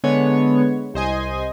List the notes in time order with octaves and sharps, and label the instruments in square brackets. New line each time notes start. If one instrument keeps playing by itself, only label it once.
[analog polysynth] D3 G#3 B3 C#5
C2 C5 D#5 G#5